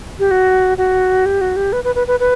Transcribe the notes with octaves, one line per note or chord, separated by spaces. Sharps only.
G4
F#4
F#4
G4
F#4
G4
B4
B4
B4
B4
B4